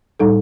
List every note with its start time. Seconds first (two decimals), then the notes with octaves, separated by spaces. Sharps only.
0.19 A2 G3 D#4 A4